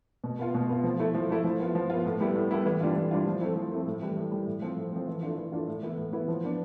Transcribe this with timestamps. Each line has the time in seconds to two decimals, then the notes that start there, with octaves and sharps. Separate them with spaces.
0.24 B2
0.39 B3 F4
0.54 B2
0.69 B3 F4
0.84 F3
0.99 A3 E4
1.14 F3
1.29 A3 E4
1.44 F3
1.60 B3 F4
1.75 F3
1.90 B3 F4
2.06 A2
2.20 G3 B3 E4
2.36 A2
2.51 G3 B3 E4
2.66 E3
2.81 G3 D4 F4
2.96 E3
3.11 G3 D4 F4
3.26 F3
3.41 A3 C4 E4
3.56 F3
3.71 A3 C4 E4
3.87 A2
4.02 E3 G3
4.17 A2
4.32 E3 G3
4.46 A2
4.62 F3 C4
4.77 A2
4.92 F3 C4
5.07 E3
5.23 A3 D4 F4
5.37 E3
5.52 A3 D4 F4
5.67 A2
5.83 E3 B3 E4
5.98 A2
6.13 E3 B3 E4
6.28 F3
6.44 B3 D4